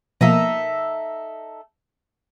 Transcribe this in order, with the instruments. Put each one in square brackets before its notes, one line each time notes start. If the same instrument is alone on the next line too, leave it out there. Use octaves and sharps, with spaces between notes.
[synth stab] B2 F3 A#3 [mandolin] D#4 A4 E5